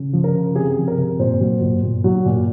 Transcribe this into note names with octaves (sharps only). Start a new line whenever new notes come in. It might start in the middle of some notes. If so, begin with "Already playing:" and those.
Already playing: C#3
F3
A#4
C#3
C3 G#4
F3
A#4
C3
A#2 C5
F#3
A#2
A#2
F#3
A#2